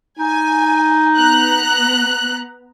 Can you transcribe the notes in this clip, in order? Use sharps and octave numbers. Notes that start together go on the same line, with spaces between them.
D#4 G#5
B3 A#5 F#6